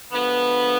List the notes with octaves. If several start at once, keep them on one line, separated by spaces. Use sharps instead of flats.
D3 F3 G#3 B3